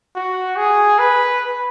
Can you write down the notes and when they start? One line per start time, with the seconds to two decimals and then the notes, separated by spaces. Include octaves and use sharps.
0.15 F#4
0.56 G#4
0.99 B4